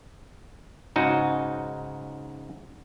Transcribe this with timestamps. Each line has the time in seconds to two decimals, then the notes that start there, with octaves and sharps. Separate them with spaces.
0.96 G#2 C#3 D#4 F#4